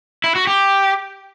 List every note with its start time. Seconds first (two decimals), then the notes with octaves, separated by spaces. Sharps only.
0.24 E4
0.36 F#4
0.47 G4